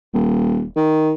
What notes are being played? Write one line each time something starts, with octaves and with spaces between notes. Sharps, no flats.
D#1
D#3